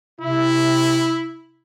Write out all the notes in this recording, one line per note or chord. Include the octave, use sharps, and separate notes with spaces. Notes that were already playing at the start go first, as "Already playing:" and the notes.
C3 E4